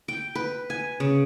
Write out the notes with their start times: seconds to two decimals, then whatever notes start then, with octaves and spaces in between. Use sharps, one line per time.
0.08 G5
0.35 B4
0.70 G#5
1.00 C#3